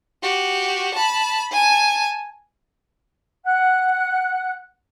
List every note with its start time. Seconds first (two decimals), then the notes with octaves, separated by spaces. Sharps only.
0.23 F#4 G4
0.94 A5 B5
1.52 G#5 A5
3.44 F#5 F#6